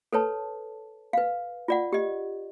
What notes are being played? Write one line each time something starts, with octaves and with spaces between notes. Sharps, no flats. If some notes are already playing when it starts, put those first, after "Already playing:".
A4 B4 C#5 A5
B4 F5
F4 D5 F#5
G4 D#5